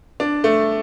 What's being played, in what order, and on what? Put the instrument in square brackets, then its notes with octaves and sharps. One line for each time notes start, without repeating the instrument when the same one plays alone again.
[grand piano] D4
A3